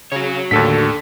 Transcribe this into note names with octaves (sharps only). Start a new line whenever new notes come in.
C#3 F#4 C#5
D#2 A2 D3 A4 B6